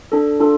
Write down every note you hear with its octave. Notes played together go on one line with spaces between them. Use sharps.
D4 A4
D4 F4 A4